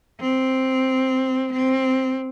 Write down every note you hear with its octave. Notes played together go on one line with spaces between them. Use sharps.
C4
C4